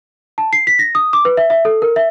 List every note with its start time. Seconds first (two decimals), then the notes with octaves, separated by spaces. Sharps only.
0.38 A5
0.53 C7
0.67 B6
0.79 A#6
0.95 D#6
1.13 D6
1.25 B4
1.37 E5
1.50 E5
1.65 A4
1.82 A#4
1.96 E5